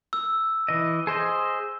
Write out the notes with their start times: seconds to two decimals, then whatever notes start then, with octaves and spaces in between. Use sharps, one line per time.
0.13 E6
0.68 E3 D#5
1.07 G#4 C5 D#5